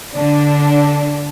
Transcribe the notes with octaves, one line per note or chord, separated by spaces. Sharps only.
D3 D4